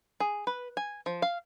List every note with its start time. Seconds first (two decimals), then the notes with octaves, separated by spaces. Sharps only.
0.20 G#4
0.47 B4
0.77 G#5
1.06 F3
1.22 F5